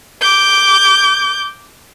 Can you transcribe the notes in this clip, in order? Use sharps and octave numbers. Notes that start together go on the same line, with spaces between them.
D6 G6